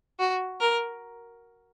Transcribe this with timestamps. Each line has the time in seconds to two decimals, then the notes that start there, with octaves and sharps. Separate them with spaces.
0.19 F#4
0.60 A#4